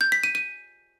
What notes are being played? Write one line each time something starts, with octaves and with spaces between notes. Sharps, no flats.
G6
B6
D#7
D#7